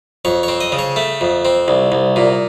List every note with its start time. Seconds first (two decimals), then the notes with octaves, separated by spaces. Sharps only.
0.25 F2 C#5
0.43 C4 C#5
0.61 D#5
0.72 C#3
0.79 C#5
0.96 A3
1.21 F2
1.45 C4
1.68 C2
1.92 C2
2.16 A#2